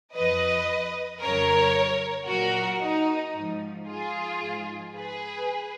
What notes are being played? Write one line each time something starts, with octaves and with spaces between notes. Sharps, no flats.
F2 F3 B4 D#5
F2 C#3 F#3 A#4 C#5
A#2 F#3 F#4 A#4
D#4
G#2 F3
F4 G#4
G#2 F3
G#4 B4